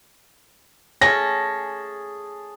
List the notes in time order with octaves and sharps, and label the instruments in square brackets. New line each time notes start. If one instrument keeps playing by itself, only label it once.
[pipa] A3 C#4 [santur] G#4 A5 [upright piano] A#6